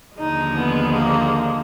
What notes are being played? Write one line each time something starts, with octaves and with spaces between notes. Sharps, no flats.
D#2 D3 F3 G#3 D#4
B3
A#3